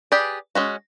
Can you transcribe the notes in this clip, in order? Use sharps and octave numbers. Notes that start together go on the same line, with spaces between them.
G4 G#4 B4 D5
G#3 C#4 F#4